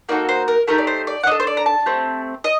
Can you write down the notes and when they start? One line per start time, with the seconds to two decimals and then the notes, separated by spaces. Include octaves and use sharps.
0.09 A#3 D#4 F#4 A4 D5
0.29 C5
0.48 A#4
0.67 A3 D#4 G4 A#4
0.78 D5
0.87 C5
1.07 D5
1.23 F#5
1.27 D4 A4 D#5
1.40 C5
1.47 D5
1.57 A#5
1.66 A5
1.86 A3 C4 G4
2.44 D#5